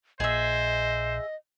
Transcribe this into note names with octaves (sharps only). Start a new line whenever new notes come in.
A#1 G#4 C5 D#5 E5